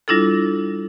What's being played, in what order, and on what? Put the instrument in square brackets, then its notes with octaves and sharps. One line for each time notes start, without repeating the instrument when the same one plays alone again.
[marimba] G3 D4 E4 F4 A4